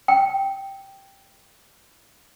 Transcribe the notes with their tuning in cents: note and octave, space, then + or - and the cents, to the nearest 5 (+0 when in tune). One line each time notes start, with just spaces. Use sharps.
G5 -5